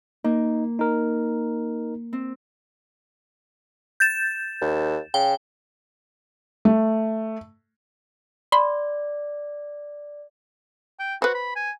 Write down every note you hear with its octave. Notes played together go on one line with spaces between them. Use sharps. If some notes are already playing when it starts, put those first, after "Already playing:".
A#3 D#4
D#4 A#4
C4
G6 A6 E7
D#2
C#3 G5
A3
D5 B5 C6
G5
F#4 B4 C5
B5
G#5